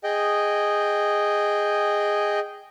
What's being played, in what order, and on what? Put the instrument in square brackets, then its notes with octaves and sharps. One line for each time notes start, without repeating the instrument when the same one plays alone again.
[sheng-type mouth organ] G#4 D#5 G5